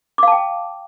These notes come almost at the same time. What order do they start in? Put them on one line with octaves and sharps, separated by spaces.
D6 F5 A5 G5